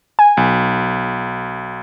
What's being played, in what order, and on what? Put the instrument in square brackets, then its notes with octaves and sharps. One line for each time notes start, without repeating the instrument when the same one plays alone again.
[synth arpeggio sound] G#5
[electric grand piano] B1